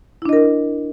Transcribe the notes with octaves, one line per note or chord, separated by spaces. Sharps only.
D4 E4 A#4 D#5